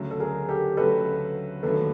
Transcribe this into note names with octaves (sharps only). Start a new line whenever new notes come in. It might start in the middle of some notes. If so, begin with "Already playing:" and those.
Already playing: D2 C#3 F#3 A3
A4
G#4 A#4
G4 A4
D2 C#3 F#3 A3 A4 B4
E1 D#2 D3 F#3 A3 A4 B4